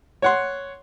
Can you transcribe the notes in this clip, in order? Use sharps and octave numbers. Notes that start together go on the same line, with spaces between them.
C#5 F#5 C6